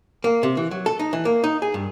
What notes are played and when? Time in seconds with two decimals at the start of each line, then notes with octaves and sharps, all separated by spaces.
0.24 A#3
0.43 C3
0.57 E3
0.71 F#3
0.86 A4
0.99 D#4
1.13 E3
1.25 A#3
1.44 D#4
1.62 G#4
1.74 G2